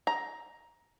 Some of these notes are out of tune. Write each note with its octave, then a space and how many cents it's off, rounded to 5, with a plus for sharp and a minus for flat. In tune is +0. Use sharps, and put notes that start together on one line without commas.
A#5 +10